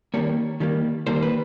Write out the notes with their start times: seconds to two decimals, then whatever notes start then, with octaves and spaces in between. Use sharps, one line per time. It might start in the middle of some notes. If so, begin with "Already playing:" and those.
0.14 D#3 G3 A#3 C#5
0.60 D#3 G3 A#3
1.07 D#3 G3 A#3 C5
1.22 B4